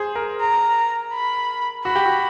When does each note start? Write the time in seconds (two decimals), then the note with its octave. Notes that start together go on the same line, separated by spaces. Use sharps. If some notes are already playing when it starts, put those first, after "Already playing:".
Already playing: G#4 C5
0.16 A#4
0.41 A#5
1.13 B5
1.85 F#4 B5
1.96 G4
2.06 F#4